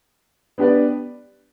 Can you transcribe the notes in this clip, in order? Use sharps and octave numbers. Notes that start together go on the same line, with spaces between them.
B3 D4 G4 B4 D5